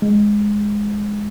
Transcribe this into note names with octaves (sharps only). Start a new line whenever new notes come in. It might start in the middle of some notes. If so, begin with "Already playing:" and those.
G#3